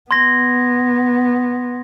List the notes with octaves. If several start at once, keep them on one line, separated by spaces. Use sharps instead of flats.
B3 C6 G#6 A#6